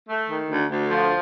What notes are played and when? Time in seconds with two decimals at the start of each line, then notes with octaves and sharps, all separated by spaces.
0.09 A3
0.29 D#3
0.49 D2
0.69 D2
0.90 F3